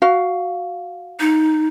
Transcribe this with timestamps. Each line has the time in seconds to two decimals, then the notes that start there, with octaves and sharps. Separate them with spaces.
0.02 F#4 F5
1.20 D#4